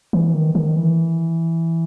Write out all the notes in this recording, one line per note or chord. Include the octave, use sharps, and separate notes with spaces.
E3
D#3
D#3
E3